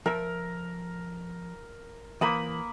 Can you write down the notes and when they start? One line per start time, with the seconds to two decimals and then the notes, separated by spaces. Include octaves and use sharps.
0.06 F3 A#4 E5
2.21 E3 A#3 C5 B5 D#6